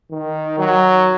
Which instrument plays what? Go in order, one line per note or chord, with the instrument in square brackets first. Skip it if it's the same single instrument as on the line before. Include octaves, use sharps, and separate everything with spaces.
[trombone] D#3
F#3